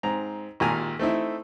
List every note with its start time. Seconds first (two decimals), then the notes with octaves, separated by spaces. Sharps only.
0.03 G#2 C4 A#5
0.60 G#1 A#2 G4 G#5 A#5
0.99 A3 C4 D#4 E4